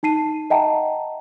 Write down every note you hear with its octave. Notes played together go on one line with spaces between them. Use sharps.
D#4 A5 C7 D#7
D#5 E5 F#5 G5 A5 A#5